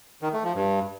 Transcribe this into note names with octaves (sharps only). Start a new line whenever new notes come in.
D#3
A3
F3
G2